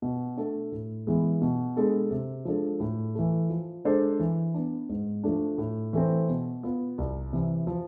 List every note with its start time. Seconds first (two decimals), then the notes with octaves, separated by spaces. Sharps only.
0.02 B2
0.37 A3 D4 A4
0.72 A2
1.07 E3 G#3 B3
1.41 B2
1.76 G#3 B3 D4 A4
2.11 C3
2.45 F3 G#3 D4 A4
2.80 A2
3.15 E3 A3
3.50 F3
3.85 G#3 D4 A4 C5
4.20 E3
4.54 B3 D4
4.89 G#2
5.24 F3 A3 D4
5.58 A2
5.93 E3 A3 C4
6.29 B2
6.63 B3 F4 B4
6.98 C2
7.33 C3 E3
7.67 F3